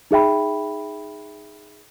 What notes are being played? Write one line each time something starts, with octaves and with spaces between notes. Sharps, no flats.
D#4 G#4 E5 G5 B5